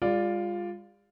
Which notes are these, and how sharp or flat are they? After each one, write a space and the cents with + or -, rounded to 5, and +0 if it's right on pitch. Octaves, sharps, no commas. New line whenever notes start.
G#3 -45 F4 +5 D5 +0